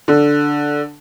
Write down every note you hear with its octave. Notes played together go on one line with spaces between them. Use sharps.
D3